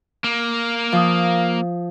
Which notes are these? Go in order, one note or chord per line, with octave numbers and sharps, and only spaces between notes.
A#3
F3 D#6